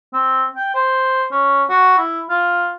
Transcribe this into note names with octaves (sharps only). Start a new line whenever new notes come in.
C4
G5
C5
C#4
F#4
E4
F4